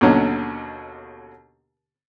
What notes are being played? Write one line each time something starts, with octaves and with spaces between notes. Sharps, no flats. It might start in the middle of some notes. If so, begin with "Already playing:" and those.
D#2 B2 D3 F#3 C#4